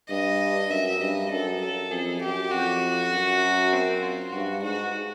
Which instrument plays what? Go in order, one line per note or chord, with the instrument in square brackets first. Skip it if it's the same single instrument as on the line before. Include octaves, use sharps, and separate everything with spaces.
[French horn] G2 [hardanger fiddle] D#5
[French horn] F#2 [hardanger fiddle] E5
[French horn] G2 [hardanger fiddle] D#5
[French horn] F#2 [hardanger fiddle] A4
[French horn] F#2 [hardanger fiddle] A4
[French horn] F2 [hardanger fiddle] G#4
[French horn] F#2 [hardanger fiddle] G4
[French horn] F2 [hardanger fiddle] F#4
[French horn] F#2
[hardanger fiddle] C4
F4
[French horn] G2 [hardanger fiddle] F#4
[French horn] G#2 [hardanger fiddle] F#4